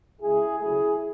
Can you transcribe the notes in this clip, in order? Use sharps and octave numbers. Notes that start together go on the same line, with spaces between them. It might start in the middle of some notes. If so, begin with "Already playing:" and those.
C#3 G#3 E4 G#4
C#3 F#3 A3 E4 G#4